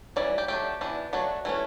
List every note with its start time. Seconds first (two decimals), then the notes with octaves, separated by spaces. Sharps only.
0.16 E3 G3 C#4 D5
0.38 G4
0.48 F#3 A3 D4 G4
0.81 E3 B3 D4
1.13 F#3 A3 D4 F#4
1.45 E3 A3 C#4